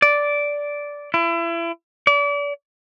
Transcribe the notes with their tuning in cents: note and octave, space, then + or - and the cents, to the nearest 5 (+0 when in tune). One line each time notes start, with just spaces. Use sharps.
D5 -10
E4 +35
D5 -35